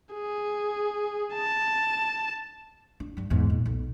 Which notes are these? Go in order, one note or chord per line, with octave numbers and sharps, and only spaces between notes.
G#4
A5
D4
G2 G3
E2 G#2
A#2
B1